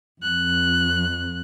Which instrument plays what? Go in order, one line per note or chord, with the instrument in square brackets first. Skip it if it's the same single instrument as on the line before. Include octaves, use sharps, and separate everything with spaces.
[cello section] F2 [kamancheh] F#6